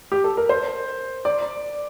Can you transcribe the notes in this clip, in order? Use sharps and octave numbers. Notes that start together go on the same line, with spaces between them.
G4
A4
A#4
C5
D5